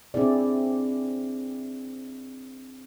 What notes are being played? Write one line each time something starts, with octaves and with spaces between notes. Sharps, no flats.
C4 D4 E4 G#4 D5